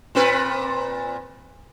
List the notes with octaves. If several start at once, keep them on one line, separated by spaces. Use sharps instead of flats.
A#2 C4 B4